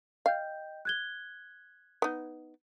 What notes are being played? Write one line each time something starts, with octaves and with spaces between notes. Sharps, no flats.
D#5 F5 G5 G6
F#6 G#6 G7
B3 D#4